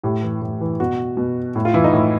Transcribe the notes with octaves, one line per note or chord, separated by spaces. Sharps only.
A2 G4
E3
A2
E3
B2 F#4
B2
A2
F4
E3 E4
D#4
A2